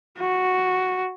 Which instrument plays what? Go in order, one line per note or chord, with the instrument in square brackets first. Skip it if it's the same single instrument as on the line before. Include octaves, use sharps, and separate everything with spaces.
[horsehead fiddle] F#4